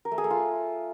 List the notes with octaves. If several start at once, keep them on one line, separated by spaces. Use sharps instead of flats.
A#4
A3
G#4
A3
F4